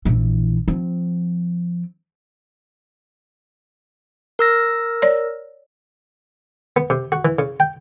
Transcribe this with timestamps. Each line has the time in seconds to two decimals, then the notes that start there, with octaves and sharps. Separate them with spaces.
0.05 A#1 E3
0.68 F3 C4
4.39 A#4 E6 A#6
5.02 C#5 D5
6.76 B3
6.90 C3
7.12 F#4
7.25 E3
7.39 C#3
7.60 G5